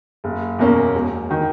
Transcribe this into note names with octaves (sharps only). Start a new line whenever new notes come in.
F#1
E2 B2 A#3 C#4
E1
D#3